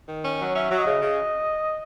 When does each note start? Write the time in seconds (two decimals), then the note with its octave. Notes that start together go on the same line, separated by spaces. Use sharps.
0.09 D#3
0.25 C#4
0.40 F#3
0.55 C#4 E5
0.71 F#3
0.78 D#5
0.86 C#3
1.02 C#3